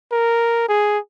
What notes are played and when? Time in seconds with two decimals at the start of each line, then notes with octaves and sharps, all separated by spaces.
0.12 A#4
0.69 G#4